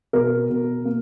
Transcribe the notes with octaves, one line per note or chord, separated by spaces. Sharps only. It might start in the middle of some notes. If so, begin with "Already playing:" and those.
B2 A#4
B2
A#3